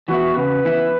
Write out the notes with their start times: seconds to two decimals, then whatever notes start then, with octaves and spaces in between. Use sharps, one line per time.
0.08 E3 B3 E4 F#4
0.37 C#3 B4
0.65 E3 B3 E4